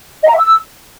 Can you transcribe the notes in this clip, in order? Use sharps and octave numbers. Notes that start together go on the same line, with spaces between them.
D#5
A#5
E5
E6